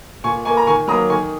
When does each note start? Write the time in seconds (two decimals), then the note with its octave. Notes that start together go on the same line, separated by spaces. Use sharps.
0.24 A#2 G#5 C#6
0.45 A#3 G#5 C#6
0.57 A#5
0.67 D#3 G#5 C#6
0.88 F#3 A#3 A#5 D#6
1.10 D#3 G#5 C#6